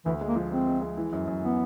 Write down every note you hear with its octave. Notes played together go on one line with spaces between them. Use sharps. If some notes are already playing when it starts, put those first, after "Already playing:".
D2 E3
G#3
A#3
F3
G#3 C4
G#3
G#3
E3
F#2
F#2
E3 B3